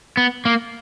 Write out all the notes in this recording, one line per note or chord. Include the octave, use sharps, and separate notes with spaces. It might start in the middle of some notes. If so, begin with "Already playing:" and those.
B3
A#3